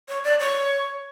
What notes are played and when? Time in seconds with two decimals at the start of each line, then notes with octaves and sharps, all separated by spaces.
0.09 C#5
0.24 D5
0.40 C#5